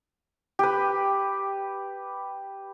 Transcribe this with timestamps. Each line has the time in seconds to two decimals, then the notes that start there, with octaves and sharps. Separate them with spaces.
0.59 G4 B4